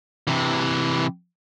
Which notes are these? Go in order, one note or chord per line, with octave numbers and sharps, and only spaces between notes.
C3 E3